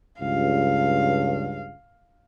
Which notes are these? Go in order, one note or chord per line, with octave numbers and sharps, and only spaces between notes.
C#2 G2 F5